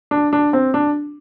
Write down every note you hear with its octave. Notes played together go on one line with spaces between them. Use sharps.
D4
D4
C4
D4